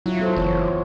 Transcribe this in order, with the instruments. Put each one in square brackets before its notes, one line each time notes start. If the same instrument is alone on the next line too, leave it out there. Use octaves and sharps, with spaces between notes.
[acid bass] F#3 [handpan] E4 F4
[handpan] B3 A4 C5
[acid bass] F#1 [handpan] E3 B3 C#5